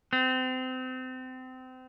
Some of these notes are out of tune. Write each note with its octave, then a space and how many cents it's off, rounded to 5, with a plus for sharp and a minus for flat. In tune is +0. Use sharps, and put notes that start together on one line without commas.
C4 -30